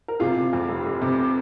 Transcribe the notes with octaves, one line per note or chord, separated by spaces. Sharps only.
A#4
C3 F4 G#4
C3
F2
F1
F1
C3